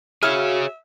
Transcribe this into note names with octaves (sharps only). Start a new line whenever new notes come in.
F#4 G#4 C#5 E5 F6